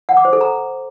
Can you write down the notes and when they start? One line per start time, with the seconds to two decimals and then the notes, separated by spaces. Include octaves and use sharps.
0.09 F#5
0.17 D6
0.25 C5
0.33 A4
0.41 A#5